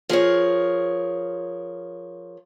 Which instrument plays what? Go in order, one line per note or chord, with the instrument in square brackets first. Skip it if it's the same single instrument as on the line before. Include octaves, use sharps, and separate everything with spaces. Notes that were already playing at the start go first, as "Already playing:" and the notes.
[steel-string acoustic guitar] F3 G#4 A#4 C#5